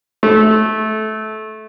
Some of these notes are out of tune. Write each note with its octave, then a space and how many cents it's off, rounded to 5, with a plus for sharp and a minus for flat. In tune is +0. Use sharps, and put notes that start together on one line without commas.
A3 -20